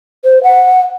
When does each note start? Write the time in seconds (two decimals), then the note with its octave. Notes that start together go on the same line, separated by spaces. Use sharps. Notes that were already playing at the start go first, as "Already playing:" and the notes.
0.24 C5
0.43 F#5